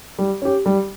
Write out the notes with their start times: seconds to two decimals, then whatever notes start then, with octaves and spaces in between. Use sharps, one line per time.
0.19 G3
0.42 C#4 G4
0.66 G3